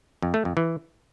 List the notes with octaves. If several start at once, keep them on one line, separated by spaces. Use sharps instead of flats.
F2
A3
F2
E3